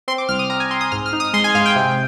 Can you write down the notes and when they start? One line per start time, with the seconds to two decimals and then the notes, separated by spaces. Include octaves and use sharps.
0.08 C4 C6
0.18 D6
0.29 C2 F6
0.39 D#6
0.50 C4 A#5
0.60 G#5
0.70 C4 C6
0.81 D#6
0.92 G#2 F6
1.06 F6
1.13 D#4
1.20 D#6
1.33 G#3 C6
1.44 G#5
1.55 G#2 F5
1.65 G5
1.76 C3